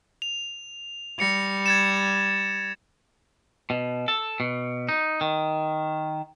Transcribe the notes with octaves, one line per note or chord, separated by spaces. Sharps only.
F7
G3 A#6 C#7 F7
G#6 A6 E7
B2
A4
B2
D#4
D#3